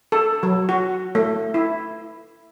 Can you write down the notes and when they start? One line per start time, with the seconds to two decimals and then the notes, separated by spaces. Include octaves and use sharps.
0.12 A4
0.43 F#3
0.69 F#4
1.15 A3
1.54 E4